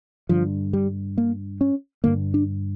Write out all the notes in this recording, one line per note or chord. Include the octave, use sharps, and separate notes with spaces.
G2 D3 F3
G3
A#3
C#4
G2 D3 A#3
D4